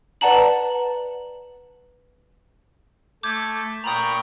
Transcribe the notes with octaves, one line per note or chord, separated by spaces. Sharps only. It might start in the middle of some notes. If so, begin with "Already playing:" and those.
B4 D5 F#5 A5 A#5 F#7
A3 D6 G6 G#6
A#2 G5 A#5 B5 C#6 D#6